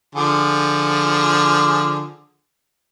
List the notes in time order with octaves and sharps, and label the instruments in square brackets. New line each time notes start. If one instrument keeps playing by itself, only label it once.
[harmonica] D3 F3 G#4